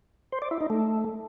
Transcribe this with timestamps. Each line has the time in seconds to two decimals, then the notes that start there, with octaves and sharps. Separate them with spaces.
0.32 C5
0.42 D5
0.51 E4
0.61 D#4
0.70 A3